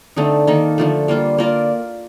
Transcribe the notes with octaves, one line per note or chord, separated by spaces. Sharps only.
D3 A3 C4 D#4
D#3 A#3 D#4 A4
D3 F3 A3
G3 A#3 F4
A#3 F4 A#4 D5